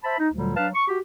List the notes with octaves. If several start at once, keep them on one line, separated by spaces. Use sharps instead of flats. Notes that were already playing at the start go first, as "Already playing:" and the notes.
C5 E5 A5 B5
D#4
D2 A#2 D3 F#3 G3
F#3 D4 B4 F5 A5
C#6
F#4 G4